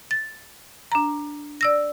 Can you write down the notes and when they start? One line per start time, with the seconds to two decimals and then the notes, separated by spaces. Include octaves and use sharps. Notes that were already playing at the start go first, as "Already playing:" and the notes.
0.11 A6
0.92 D4 A#5
1.61 D5 E6 A#6